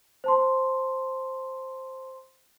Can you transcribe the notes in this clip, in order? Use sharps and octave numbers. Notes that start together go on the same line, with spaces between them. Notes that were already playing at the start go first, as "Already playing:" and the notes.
C5 A5 C6